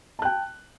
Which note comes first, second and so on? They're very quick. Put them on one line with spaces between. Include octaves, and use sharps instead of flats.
A5 F#6 G5